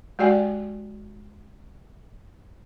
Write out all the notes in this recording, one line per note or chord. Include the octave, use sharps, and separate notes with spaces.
G#3 F#4 G4 D5 G5 G#5